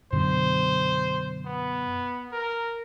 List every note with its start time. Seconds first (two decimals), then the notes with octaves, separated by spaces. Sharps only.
0.12 F#2 B2 D3 C5
1.46 B3
2.32 A#4